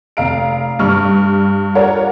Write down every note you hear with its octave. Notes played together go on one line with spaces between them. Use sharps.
F1 F5 A#5 D7
G2 G3 C#6 F6
F4 A#4 C#5 D5 F#5